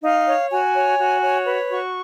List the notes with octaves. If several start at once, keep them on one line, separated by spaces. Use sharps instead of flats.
D#4 F5
C#5
F#4 G#5
C#5
F#4
C#5
B4
F#4 C#6